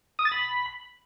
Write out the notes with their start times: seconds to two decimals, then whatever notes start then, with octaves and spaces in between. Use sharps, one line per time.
0.19 D#6
0.25 A6
0.32 B5